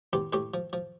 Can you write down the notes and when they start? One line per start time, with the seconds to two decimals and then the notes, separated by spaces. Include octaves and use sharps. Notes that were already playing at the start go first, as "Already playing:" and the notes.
0.13 E2 G4 B4
0.33 A2 G4 B4
0.54 F3
0.73 F3